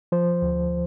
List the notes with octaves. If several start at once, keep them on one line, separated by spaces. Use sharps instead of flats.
F3 C5
D2